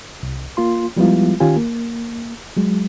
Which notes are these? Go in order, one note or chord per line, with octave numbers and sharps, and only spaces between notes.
C2
A#3 F4 C6
F3 G3 G#3 B3 E4 F4
D#3 C#4 F4 G4 G#5
A#3
F#3 G#3